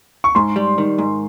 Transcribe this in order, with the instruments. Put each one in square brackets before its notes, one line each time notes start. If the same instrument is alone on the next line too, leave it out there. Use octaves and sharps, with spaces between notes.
[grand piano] C#6
[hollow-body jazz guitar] G#2 [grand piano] C6
[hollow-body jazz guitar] G3
D#3
G#2